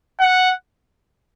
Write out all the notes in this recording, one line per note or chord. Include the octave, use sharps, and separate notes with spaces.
F#5